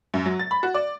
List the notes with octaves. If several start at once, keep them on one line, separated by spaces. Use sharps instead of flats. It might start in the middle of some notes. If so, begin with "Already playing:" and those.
F#2
F#3
A6
B5
F#4
D5